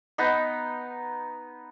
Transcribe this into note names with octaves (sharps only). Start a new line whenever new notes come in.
B3 D#4